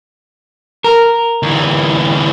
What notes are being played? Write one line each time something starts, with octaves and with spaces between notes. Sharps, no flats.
A#4
D2 E3